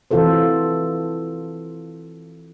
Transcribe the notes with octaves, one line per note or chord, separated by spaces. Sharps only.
E3 C4 F4 F#4 A4 C5